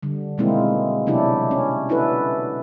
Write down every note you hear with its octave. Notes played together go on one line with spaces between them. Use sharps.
D3 G3
B2 D#3 G#3 A#3 C4 E4
C3 F#3 B3 D4 E4 G4
C#4
D4 E4 F#4 A4 B4